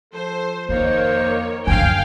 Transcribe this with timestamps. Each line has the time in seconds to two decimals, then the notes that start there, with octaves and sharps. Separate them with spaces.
0.13 F3 A4 C5
0.69 F2 D#3 A#3 C5 C#5
1.67 F#2 D3 F5 G5 G#5